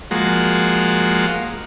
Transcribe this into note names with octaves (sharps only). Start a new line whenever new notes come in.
F3 G#3 A#3 F#4